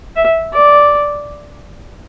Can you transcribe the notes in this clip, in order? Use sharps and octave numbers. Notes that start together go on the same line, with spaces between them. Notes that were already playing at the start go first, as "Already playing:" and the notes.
E5
D5